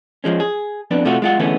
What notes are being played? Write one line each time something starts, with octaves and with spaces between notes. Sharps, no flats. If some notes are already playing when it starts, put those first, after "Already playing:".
F3 F#3 G#3 C#4
G#4
F2 B3 D4
C3 A3 F4 F#4
G#3 F4 F#5
D3 E3 G#3 A3 B3 C#4